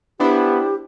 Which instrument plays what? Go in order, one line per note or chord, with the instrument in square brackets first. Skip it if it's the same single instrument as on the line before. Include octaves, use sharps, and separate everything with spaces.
[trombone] B3 [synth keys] D4 E4 C5 [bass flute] G4